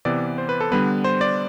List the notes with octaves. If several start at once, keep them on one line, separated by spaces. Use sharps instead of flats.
C3 E3 B3 D5
C5
B4
A4
D3 G3 B3 B4
C5
D5